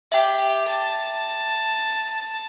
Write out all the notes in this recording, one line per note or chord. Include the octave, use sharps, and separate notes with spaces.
G4 E5 G5
A5